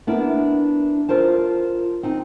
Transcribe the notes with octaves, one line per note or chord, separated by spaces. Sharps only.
B3 D4 E4 A#4
F4 A#4 C5 A5
C4 D#4